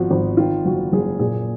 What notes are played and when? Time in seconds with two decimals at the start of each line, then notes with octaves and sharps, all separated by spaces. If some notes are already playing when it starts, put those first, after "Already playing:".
Already playing: G#1 F3 F#4
0.10 G#1
0.37 D#3 F4
0.65 F#1 F#4
0.92 F#1 G#4
1.19 A#2 G#4